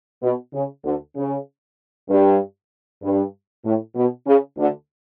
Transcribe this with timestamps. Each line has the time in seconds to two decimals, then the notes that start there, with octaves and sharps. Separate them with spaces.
0.22 B2
0.53 C#3
0.84 D2 D3
1.16 C#3
2.09 G2
3.03 G2
3.64 A2
3.95 B2
4.26 C#3
4.57 D2 D3